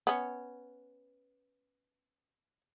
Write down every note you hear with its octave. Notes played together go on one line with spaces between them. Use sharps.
B3 C#4